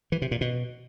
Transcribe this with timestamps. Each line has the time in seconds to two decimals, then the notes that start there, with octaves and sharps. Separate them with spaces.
0.12 E3
0.22 C3
0.31 A#2
0.41 B2